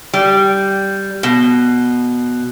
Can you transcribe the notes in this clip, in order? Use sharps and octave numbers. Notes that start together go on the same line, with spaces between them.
G3
B2